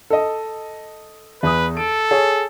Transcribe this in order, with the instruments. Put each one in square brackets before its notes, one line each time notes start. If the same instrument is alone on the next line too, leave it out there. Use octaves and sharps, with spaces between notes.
[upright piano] A4 D#5
[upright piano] E2 D#6 [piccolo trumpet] B4
[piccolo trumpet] A4 [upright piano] D7
[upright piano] G#4 C#5